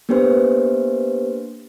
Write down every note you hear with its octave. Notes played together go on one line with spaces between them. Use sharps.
A#3 B3 D4 G4 B4 C5